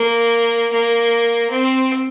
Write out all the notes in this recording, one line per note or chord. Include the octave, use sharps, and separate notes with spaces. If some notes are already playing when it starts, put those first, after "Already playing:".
Already playing: A#3
A#3
C4